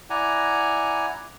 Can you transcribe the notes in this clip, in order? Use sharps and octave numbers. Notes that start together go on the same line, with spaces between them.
E4 D5 F#5 G#5 A#5